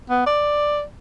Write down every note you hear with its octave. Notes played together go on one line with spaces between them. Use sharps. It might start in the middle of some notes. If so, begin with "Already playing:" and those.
B3
D5